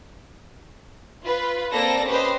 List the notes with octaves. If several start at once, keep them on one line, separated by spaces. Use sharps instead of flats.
F4 B4
A#3 C4 A4 D5 A#6
C#4 G4 B4 C5 D#5